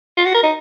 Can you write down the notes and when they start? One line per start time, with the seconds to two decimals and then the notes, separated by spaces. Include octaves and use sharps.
0.17 F4
0.25 F#4
0.34 A#4
0.43 D#4